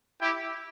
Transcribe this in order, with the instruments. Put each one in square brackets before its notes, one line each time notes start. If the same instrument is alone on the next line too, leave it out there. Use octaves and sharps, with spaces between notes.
[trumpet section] E4 G4